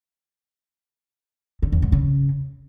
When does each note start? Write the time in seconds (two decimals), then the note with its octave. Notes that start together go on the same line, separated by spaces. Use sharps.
1.62 D3
1.72 E2
1.82 G#2
1.92 C#3